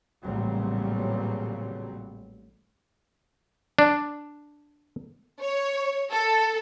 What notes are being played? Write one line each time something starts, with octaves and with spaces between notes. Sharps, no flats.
A1 A#2 C#3 F#3 G3 C4
D4
C#5
A4